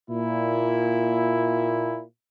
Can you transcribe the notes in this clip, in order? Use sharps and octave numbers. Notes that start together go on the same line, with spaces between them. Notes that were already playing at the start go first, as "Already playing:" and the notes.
A#2 E4